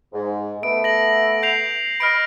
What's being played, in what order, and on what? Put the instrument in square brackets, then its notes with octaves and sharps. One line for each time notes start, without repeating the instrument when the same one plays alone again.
[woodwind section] G#2
[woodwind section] A3 B3 [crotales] D7
[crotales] A#6 F#7
G6 C7 F7
[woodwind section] D#5 B5 [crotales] F6 A#6 D7